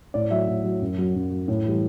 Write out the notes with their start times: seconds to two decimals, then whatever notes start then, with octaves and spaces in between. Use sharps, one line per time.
0.14 A2 D5
0.31 F#3 E5
0.48 A2
0.64 F#3
0.81 F#2
0.98 F#3
1.15 F#2
1.31 F#3
1.48 A2
1.65 E3 G3